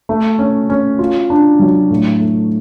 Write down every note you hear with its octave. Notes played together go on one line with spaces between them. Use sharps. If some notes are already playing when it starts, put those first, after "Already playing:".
A3
C#4
C#4
F4
D4
F#3
A2
A3